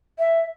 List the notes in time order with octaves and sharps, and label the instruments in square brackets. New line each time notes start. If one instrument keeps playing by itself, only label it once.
[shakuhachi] E5